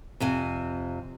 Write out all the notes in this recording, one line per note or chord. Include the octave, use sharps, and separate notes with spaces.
F2 C3 G#5